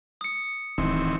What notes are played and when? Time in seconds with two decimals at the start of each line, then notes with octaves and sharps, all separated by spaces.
0.21 D#6 C#7
0.78 D1 D#3 E3 C4